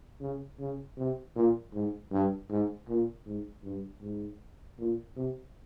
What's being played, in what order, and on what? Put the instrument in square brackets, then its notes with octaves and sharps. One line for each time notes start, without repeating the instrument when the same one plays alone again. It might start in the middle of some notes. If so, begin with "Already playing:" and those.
[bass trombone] C#3
C#3
C3
A#2
G#2
G2
G#2
A#2
G#2
G2
G#2
A#2
C3